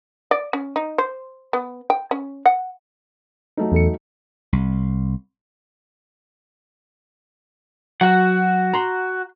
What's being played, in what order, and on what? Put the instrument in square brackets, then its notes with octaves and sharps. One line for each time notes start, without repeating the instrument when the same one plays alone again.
[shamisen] D5
C#4
D#4
C5
B3
G5
C#4
F#5
[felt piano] F#3 A3 D#4
[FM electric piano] E2 A4 C#7
[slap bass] C2
[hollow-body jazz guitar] F#3 [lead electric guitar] F#4 F#5
[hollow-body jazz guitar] A#5 C6